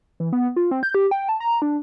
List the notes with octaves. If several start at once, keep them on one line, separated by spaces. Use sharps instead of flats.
E3
B3
F4
C4
G6
G4
G5
A5
A#5
D4